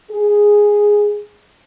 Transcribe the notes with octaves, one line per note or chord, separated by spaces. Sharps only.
G#4